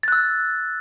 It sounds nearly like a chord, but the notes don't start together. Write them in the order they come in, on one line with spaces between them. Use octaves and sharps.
A6 F#6 E6